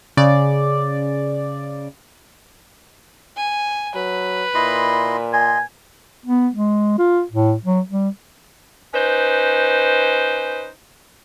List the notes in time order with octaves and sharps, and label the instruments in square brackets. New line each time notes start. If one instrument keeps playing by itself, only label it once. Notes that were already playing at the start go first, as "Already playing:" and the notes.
[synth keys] C#3 D5
[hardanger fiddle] G#5
[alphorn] F#3 [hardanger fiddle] B4
[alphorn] A#2 [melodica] E4 D#5 C6
[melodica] D#5 C6 [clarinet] G#5
[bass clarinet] B3
G#3
F4
A2
F#3
G3
[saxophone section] C#4 D#4 B4 C5